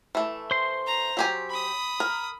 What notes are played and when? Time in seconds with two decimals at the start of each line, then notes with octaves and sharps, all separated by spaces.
0.15 E3 A3
0.51 C5 C6
0.86 A#5
1.17 F#3 G4 G#5
1.50 B5 D#6
2.00 A#4